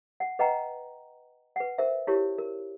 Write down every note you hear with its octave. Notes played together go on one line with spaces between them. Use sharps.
F#5
B4 D#5 F#5 G5 A#5
B4 F#5
A#4 C5 E5
E4 F4 G4 A#4 C#5
A#4